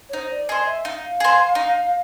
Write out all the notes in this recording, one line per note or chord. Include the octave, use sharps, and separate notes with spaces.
C#5
D#4 C5
D5
G#4 C5 D#5
E5
D#4 F5
G#4 C5
D#4